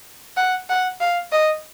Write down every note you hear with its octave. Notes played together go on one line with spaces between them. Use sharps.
F#5
F#5
F5
D#5